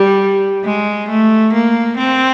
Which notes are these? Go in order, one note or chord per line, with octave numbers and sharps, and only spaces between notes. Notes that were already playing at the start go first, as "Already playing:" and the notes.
Already playing: G3
G#3
A3
A#3
C4